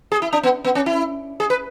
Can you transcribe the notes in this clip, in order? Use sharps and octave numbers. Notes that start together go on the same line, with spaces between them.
G#4
E4
D4
B3
B3
C#4
E4
G#4
B4